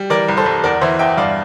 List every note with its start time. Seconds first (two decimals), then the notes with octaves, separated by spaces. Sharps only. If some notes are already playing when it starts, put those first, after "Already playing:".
Already playing: G3
0.10 E3 A#4 D5
0.29 C2
0.37 A4 C5
0.46 C2
0.63 E2 A#4 D5
0.81 E3 C5 E5
0.99 E2 E5 G5
1.17 G2 D5 F5